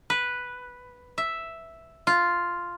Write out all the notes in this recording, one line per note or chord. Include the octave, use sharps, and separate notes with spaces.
B4
E5
F4